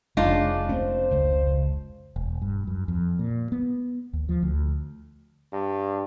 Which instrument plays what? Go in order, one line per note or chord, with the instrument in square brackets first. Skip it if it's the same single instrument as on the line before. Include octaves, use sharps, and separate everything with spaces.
[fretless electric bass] F1 [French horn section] C#3 [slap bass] G#3 [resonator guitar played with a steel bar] D4 D#4 F4
[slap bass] A3 C4 C#4 [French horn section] C5
[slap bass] C#2 C#3
[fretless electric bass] E1
G2
F#2
F2
A#2
B3
D#2
F3
D2
[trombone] G2